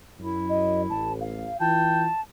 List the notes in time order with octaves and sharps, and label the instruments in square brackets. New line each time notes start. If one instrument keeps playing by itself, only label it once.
[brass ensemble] F#2 [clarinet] E4
[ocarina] D#5
[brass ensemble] A1 [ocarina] A5
[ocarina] F5
[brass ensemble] E3 F4 [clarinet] G5 [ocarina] A5